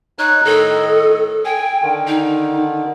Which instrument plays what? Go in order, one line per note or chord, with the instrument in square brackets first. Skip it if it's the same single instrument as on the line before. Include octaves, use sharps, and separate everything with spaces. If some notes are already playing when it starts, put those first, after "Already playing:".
[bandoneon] D#4 C#5 [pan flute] F#6
[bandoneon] A2 D#3 D#5 [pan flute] A4
[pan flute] G5 [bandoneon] G#5
[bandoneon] D3 D#3
[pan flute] D#4